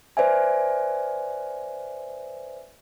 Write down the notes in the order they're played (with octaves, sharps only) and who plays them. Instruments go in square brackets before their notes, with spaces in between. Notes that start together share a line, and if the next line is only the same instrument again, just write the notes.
[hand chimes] B4 C5 D5 E5 G#5